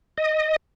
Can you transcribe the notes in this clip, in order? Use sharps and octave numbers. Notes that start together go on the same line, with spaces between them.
D#5